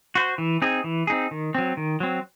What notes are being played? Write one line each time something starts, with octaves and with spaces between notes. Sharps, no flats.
F#4 C5
E3
C4 D#4 G#4
E3
C4 D#4 G#4
D#3
F#3 C4
D#3
F#3 C4